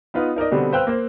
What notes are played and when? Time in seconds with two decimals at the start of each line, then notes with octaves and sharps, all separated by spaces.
0.14 B3 D#4 F4 B4
0.36 D#4 A#4 D5 D#5
0.51 B2 D3 G3 B3 C4
0.72 B4 C5 F5 G5 E6 F#6
0.87 A#3 C5